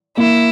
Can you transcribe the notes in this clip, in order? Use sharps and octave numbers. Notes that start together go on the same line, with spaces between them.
A#3 E4